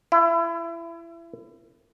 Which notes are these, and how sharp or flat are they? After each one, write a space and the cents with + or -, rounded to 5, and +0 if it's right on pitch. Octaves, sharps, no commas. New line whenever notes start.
E4 +30